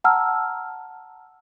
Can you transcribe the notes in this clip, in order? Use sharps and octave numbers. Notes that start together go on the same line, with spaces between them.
F#5 A5 A#5 E6 F6